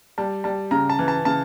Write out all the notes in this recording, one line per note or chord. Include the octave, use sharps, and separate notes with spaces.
G3 A5
G3 A5
C#3 A#5
A5
E3
A5
C#3 A5